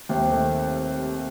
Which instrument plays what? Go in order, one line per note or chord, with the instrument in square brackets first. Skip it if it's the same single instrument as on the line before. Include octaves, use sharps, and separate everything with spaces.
[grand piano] D#2 [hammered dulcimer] C3
[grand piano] D#3 A3 C4